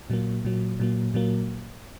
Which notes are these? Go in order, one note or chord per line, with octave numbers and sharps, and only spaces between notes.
A#2 F#3 A#3
A#2 F#3 A#3
A#2 F#3 A#3
A#2 F#3 A#3